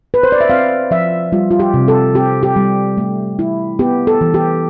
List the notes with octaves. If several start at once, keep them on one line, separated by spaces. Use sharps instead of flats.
B4
C5
D5
E5
C4 F5
F3 E5
G3 F4
F4
G4
C3
A4
C4 G4
G4
G3
A3
E4
B3 G4
A4
E3
G4